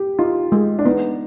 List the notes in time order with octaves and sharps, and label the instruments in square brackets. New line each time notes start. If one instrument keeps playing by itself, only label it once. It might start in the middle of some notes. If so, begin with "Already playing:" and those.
Already playing: [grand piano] G4
[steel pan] D#4 [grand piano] F4
[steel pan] G#3
[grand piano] D4
[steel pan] B3 [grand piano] D#4